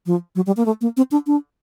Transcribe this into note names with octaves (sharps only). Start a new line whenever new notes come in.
F3
F#3
G3
A#3
A3
A#3
C4
D4
D4